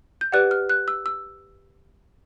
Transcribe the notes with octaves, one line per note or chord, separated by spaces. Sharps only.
G6
G4 B4 D5 F#5 F#6
F6
F#6
E6
E6